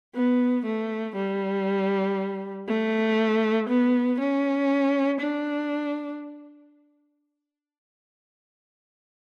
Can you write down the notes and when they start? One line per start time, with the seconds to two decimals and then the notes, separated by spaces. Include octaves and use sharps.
0.15 B3
0.65 A3
1.16 G3
2.68 A3
3.69 B3
4.20 C#4
5.21 D4